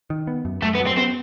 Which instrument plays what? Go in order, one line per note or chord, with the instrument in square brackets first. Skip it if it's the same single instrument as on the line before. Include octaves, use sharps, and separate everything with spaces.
[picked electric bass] D#3
B3
F#2
[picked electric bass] F#2 [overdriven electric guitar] A3
[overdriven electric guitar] B3
[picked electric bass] F#3
[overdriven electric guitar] C4
[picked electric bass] B3 [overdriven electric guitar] C4